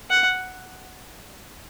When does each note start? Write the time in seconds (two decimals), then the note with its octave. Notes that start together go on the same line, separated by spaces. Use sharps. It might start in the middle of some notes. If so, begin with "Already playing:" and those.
0.10 F#5